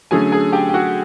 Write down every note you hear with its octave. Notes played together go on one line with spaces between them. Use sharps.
D3 F#3 A3 C#4 G#4 G#5
G#4 G#5
G4 G5
G5
F#4 F#5